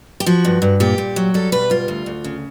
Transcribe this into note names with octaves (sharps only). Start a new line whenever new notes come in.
G4
F3 F#4
G2
G2
A#2 G4
A#2
F#3
G3 A4
B2 B4
G3 F4
D2
D2
C#3